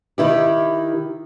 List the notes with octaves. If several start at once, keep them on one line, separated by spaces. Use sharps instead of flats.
D#3 E4 G4